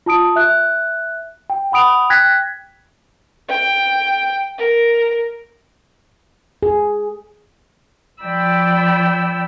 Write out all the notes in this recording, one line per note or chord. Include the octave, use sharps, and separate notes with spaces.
F4 A5 D#6 D7
E5 F#6
G5
F#5 B5 D#6 D7 F7
G5 F#6 G#6 A#6 B6
G5
A#4
G#4
F3 D5 G5 B5 E6